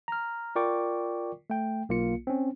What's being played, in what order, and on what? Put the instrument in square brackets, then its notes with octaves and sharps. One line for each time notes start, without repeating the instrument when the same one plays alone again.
[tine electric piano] A#5 F6
F4 A#4 D5 G5 C#6 D6
A3 G5
B1 A#3 F4 C#7
C4 C#4